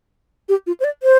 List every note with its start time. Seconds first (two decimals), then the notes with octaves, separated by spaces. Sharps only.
0.49 G4
0.67 F4
0.80 C5
0.84 D5
1.03 C5